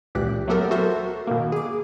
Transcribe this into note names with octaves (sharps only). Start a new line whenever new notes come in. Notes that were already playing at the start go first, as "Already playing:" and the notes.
C#2 A#2 E3 G4 F#6
F#3 A3 B3 G4 A4 A#4
F#4 A4 A#4 C5 E5
B2 D#3 A#3
G#4 D6